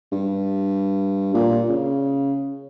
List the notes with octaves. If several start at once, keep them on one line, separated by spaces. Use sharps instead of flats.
G2
A#2
C#3